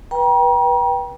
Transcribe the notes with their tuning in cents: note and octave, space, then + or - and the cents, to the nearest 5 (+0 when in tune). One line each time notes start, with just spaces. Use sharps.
B4 -25 G5 +0 A#5 +40